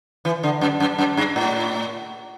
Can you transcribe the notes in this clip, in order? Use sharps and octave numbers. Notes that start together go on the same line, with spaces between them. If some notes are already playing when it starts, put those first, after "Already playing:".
E3
D3
F#2
F#2
F#2
G2
A2